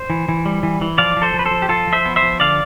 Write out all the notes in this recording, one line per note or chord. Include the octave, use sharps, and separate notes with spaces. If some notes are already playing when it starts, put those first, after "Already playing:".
Already playing: C5
E3
E3
G3
E3
E3
F3 D5 F5
F3
A4 C5
F3
B4
A4 C5
F3
G4
F3 F4 A4
F3
C5 E5
B3
C5 E5
F3
D3 D5 F5